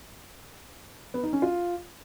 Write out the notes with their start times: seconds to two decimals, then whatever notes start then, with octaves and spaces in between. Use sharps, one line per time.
1.14 B3
1.23 D#4
1.33 C#4
1.42 F4